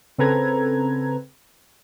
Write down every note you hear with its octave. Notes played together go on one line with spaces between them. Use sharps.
C#3 C4 A4 B4 A#5 G#6